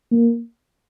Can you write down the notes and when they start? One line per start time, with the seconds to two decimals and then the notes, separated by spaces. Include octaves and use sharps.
0.12 A#3